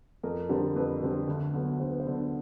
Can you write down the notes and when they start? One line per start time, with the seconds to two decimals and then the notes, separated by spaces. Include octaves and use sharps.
0.23 F2 A#4
0.49 D3 G3 C4 A#4
0.76 F2 B4
1.02 D3 G3 C4
1.28 D2
1.53 D3 F#3 B3
1.80 D2 C5
1.90 B4
2.00 C5
2.05 D3 F#3 B3